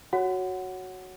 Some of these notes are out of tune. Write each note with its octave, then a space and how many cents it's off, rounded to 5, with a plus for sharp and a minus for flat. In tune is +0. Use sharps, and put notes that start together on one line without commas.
F#4 +0 C#5 +0 F#5 +0